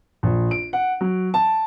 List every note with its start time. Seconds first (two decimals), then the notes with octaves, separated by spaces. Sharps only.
0.23 A#1
0.51 D7
0.73 F#5
1.01 F#3
1.34 A5